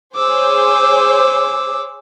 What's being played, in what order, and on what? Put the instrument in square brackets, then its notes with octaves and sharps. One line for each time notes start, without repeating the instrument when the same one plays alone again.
[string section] G#4 C5 C#5 [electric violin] D6 E6